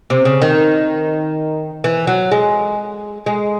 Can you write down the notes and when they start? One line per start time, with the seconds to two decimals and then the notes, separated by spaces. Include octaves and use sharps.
0.10 C3
0.25 C#3
0.42 D#3
1.84 E3
2.07 F#3
2.32 G#3
3.26 G#3